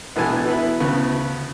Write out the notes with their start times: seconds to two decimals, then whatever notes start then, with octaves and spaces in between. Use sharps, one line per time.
0.16 A#1 B2 E3 A3 G#5 A5
0.46 E3 B3 E4
0.80 D2 C#3 B3